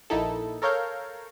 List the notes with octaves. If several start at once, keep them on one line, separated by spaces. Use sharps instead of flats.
A#1 A#3 D#4 E4 A4
A4 A#4 C#5 F5 G6